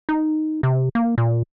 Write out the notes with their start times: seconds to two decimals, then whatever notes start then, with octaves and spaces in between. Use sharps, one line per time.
0.09 D#4
0.63 C3
0.95 A#3
1.18 A#2